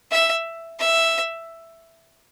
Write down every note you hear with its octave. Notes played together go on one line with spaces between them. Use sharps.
E5
E5